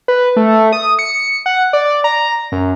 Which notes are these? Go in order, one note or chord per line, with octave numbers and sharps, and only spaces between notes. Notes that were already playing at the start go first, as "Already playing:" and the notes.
B4
A3
D#6
C#7
F#5
D5
A#5
F#2